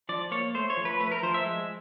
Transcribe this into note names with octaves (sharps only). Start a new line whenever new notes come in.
F3 D5
A#3 C#5
A3 C5
C#5
F3
B4
A3 B4
A#4
F3 C5
E5
G#3